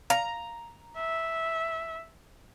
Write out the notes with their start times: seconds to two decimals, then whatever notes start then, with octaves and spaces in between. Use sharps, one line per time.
0.10 F5 A#5
0.97 E5